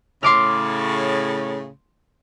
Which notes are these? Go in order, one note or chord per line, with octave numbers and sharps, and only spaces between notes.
A2 C#3 C6 D6 F6